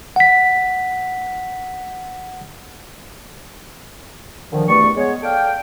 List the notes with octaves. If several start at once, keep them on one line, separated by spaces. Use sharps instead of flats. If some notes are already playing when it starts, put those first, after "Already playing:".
F#5 B6
A#2 D3 D#3 F3
E2 G2 A3 D5 C#6
G#3 B3 C#5
A4 D5 F5 G5